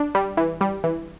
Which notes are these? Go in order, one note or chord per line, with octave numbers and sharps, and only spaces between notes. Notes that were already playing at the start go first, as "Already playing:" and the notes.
Already playing: D4
G3
E3
G3
E3